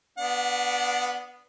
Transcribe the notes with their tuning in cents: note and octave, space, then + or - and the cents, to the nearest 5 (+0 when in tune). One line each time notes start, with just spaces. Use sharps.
B3 +0 D4 -5 F#5 -35